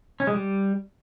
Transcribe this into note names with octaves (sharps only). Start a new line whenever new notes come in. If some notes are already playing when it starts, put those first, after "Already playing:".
C#4
G#3
G3